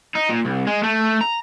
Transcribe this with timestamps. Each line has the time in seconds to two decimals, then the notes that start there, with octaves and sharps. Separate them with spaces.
0.16 D#4
0.30 A#2
0.45 C2
0.67 G#3
0.83 A3
1.21 A#5